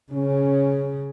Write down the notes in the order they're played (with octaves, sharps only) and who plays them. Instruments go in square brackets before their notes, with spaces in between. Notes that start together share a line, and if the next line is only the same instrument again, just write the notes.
[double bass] C#3 [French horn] C#4